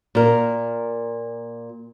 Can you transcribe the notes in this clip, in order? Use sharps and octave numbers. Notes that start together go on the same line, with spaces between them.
A#2 A#4